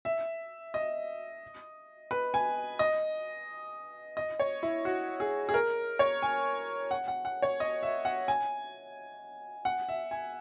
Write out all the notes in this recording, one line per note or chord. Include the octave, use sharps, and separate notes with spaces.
E5
D#5
B4
G#5
D#5
D#5
C#5
E4
F#4
G#4
G#4
A#4
C#5
G#5
F#5
F#5
F#5
C#5
D#5
E5
F#5
G#5
F#5
E5
G#5